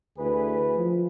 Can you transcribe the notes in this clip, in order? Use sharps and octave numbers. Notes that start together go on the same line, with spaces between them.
D2 E3 G#4 B4
F3